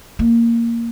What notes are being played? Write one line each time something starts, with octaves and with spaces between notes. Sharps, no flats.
A#3